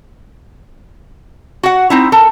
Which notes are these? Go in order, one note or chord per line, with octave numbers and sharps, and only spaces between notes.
F#4 F#5
C4 D#4 E4
A4 A#4